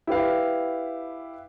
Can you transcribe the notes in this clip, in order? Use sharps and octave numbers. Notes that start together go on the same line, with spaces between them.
E4 G4 B4 F5